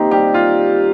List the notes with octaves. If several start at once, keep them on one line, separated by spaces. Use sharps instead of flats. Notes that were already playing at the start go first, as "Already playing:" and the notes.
Already playing: C3 D#3 A#3 C4 D#4 G4
G3 G4
F4